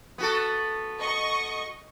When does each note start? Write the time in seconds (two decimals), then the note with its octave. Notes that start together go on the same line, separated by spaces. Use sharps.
0.18 B3 F#4 A4
1.00 D#5 C#6